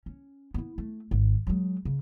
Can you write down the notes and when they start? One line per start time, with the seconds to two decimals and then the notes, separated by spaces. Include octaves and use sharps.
0.06 C#4
0.54 B3 E4
0.78 A3
1.11 G#1
1.47 F#3 G#3
1.85 C#3